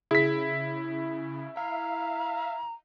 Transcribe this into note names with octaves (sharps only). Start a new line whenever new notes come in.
C#3 E4 G#4 B6
E5 F5 A#5